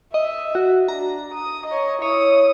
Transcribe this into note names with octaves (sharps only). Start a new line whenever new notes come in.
D#5 E5
F#4
D4 A#5
D#6
C#5 D#5
E4 C#5 D#6